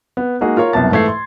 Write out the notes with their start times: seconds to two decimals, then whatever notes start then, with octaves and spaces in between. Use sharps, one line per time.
0.17 B3
0.41 G#3 A#3 D#4 F#4 G#4
0.57 F4 A#4 C#5
0.73 C2 F#2 B2 A5 A6
0.91 G#2 E3 A3 G#6 C7
1.08 C6